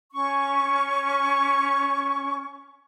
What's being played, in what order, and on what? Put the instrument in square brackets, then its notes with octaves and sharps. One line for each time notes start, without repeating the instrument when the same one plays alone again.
[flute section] C#4 C#6